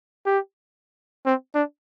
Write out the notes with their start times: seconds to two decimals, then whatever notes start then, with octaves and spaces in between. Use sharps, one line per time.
0.26 G4
1.26 C4
1.55 D4